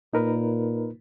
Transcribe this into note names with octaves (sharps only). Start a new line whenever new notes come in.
A#2 D#4 A#4 B4